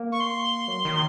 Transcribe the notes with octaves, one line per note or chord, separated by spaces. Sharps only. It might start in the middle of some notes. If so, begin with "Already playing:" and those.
Already playing: A#3
C#6
C6
F#3
D#3